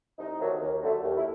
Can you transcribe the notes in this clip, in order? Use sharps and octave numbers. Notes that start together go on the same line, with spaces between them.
C2 D#4
C3 D#3 F#3 A3
D#2
D3 F#3 A3
D#2
E4